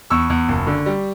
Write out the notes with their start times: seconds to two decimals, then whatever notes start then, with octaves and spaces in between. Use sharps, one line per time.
0.10 E2 C#6 E6
0.30 E2
0.48 F#1
0.67 D3
0.86 G3